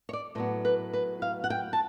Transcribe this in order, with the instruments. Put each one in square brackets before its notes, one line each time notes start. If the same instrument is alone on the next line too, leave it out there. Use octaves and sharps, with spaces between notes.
[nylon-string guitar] C#5
D5
A2 F#3 B3 C5
B4
B4
F5
F#5
G5
A5